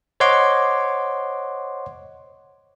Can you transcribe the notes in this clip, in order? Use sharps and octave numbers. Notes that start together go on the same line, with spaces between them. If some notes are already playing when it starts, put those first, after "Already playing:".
C5 C#5 D#5 F#5 C6 D6